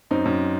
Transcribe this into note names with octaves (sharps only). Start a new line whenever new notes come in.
F#2 C4 D#4
F#2